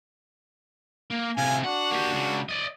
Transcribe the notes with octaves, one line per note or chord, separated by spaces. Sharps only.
A#3
A2 C3 F5 G#5
D4 F#4 F#5
A#3 G4
C#2 C#3
D5 D#5